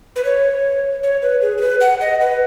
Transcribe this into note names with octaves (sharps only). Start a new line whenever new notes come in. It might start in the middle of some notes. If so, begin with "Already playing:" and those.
B4
C#5
C#5
B4
G#4
G#4
B4
F#5
D#5
B4